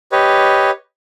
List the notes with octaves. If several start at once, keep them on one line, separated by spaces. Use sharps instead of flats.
G4 B4 C#5 D#5